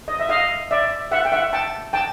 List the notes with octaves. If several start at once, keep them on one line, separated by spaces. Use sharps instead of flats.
D#5
E5
D#5 F5
D5 E5
E5 F#5
G5
E5 F#5
G5 A5
G5 A5